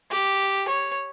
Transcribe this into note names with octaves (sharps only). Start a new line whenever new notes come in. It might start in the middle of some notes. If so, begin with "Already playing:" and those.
G4
C#5